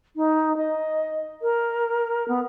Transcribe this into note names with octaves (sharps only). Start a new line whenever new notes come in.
D#4
D#5
A#4
B3